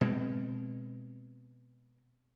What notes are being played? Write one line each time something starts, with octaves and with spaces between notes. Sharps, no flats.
B2 G#3 C4